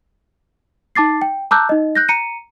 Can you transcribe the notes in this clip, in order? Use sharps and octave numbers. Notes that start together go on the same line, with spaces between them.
D#4 A5 D6 A6 C7
G5
A5 A#5 D6 E6 F#6 G6
D#4 D#5
F#6 G6 A#6
A#5 C#7 D#7